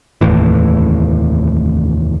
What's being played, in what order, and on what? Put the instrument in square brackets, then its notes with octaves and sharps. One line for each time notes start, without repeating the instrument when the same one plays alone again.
[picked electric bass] F1 D#2 A2 E3